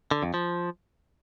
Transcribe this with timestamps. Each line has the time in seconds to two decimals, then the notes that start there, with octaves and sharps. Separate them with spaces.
0.11 D3
0.23 F2
0.34 F3